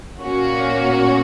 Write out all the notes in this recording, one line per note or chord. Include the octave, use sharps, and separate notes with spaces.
A#2 A#3 C#4 F#4